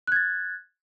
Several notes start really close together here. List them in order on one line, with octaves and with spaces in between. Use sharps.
F#6 G#6 A6